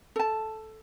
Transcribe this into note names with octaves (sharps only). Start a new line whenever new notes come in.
A4 A5